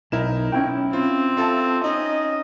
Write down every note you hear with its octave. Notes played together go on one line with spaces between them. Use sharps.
B1 D#4 E4 A#4 E7
C#4 E4 G5
C4 F4
F4 A4 E5 A5
C#4 D#4 D#5